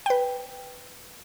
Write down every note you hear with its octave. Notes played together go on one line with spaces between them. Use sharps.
B4 G5